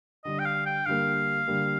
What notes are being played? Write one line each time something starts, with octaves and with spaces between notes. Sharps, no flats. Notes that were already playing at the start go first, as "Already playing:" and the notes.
D3 G3 D4 D#5
G5
F5
G5
D3 G3 A#3 F5
D3 G3 A#3